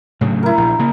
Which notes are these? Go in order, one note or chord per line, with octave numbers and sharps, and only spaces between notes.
A2 C#3 F#3
E4 A#4
A#1
C#3 A#3